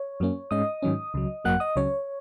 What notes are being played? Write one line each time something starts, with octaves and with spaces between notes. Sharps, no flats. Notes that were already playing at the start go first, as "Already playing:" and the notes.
Already playing: C#5
F#2 F#3 A#3 C#4
G#2 G#3 C#4 D#5 D#6
G#2 D#3 F#3 C#4
C#2 C#3 F#3
G#1 F#2 F#3 A#3 F#5 F#6
D#5 D#6
C#2 C#3 F#3 C#4 C#5